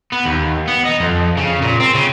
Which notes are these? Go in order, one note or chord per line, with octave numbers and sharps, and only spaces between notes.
B3
D#2
B3
D#4
F2
C#3
A#2
C4
C#3